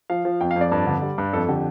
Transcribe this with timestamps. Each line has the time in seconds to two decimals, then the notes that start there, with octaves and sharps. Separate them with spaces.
0.10 F3 F5
0.25 F3
0.41 F2 G5
0.51 F5
0.56 F2
0.61 D5
0.72 G2
0.87 D3
1.02 G3
1.18 G2
1.33 F2 A4
1.48 D3 G4